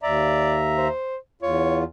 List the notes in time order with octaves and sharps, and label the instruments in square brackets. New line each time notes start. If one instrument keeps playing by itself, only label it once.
[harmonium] D#2 E5 A#5 [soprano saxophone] D5
[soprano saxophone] C5
[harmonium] E2 F4 [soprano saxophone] C#5